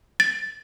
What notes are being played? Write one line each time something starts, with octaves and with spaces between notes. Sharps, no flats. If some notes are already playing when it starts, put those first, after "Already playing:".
A6